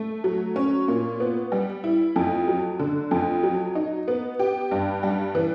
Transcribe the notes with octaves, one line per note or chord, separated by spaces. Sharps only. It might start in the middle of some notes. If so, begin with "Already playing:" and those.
Already playing: A3
F#3
C#4
A#2
B3
G3
E4
F2
F#3
D3
F2
F#3
D#4
B3
G4
G2
G3
E3